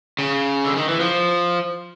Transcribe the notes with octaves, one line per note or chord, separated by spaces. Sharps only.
C#3
D3
D#3
E3
F3